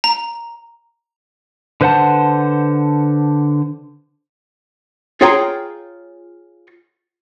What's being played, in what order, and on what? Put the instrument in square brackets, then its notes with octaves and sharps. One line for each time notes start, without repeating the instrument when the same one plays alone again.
[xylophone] A#5
[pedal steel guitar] D3 B4 C5 F#5 A5
[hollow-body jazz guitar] F4 G#4 C#5 G5 A#5 C6